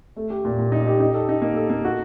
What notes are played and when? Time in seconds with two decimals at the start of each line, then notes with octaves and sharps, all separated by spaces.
0.16 A3
0.30 G4
0.45 A#2
0.59 A#2
0.72 D#4
0.87 G4
1.00 D#4
1.14 A4
1.29 D#4
1.42 A#3
1.56 A4
1.70 A#3
1.85 F#4